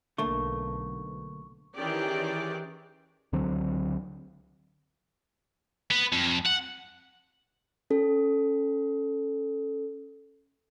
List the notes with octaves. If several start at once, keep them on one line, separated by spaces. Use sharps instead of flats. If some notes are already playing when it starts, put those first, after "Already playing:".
B1 D3 A3 A#3 C#6
D#3 E3 C#4 G4 G#4 D5
C#2 D3 F#3 C4
B3
F2
F#5
C#4 A4